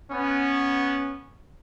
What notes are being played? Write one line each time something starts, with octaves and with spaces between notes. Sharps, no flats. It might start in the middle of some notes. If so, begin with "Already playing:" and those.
B3 C#4